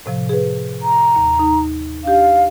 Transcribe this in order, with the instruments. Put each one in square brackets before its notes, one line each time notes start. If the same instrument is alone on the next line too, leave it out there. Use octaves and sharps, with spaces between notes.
[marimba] A2 C3 F3
G#4 B4
[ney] A#5
[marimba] D#2
D#4
[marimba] D4 G4 [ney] F5